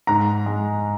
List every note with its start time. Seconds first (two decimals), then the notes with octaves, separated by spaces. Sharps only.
0.07 G#2 A#5
0.46 G#3